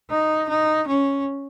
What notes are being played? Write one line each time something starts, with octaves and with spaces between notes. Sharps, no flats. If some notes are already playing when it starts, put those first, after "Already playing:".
D#4
D#4
C#4